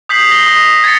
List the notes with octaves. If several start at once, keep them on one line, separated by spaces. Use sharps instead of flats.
D#6 G6 B6 C7 F#7
G6 A#6 G7
D#6 A#6
G#6 A6 C#7